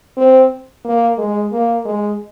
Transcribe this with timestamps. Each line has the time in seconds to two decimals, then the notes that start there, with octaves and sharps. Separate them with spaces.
0.17 C4
0.85 A#3
1.18 G#3
1.52 A#3
1.85 G#3